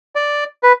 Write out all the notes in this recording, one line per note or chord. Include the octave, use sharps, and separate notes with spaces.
D5
B4